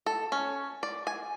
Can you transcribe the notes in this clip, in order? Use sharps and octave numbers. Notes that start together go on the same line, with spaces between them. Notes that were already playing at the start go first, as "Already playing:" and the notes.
A4
C#4
D5
G#5